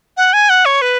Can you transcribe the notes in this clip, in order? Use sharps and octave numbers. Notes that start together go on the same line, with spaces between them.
F#5
G#5
F#5
C#5
B4